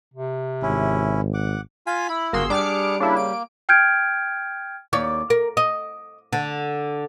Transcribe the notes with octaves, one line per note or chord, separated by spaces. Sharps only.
C3
G#1 C#4 E4
F#5 D6
F4 F5 G#5 B6
E4 B5
G1 A#3 F#4 G#4 C6 E6
G3 D4 D6 F6 C#7
C#3 A#3 D4 E4
D7
G5 F6 G6 G#6 D7
D#2 C#5 D5
A#4
D#5
D3